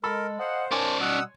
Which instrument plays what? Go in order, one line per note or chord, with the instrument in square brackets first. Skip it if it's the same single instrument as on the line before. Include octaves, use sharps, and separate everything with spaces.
[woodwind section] G#3 [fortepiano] A4 B5 [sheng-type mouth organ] A#4
[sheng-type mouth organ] C5 [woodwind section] D#5 F5 F#5
[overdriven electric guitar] C#4 D5 [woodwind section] A#4 F#5 A5 [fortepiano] C#5 G#5 C6
[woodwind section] B2 G3 [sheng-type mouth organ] F#5 D#6 E6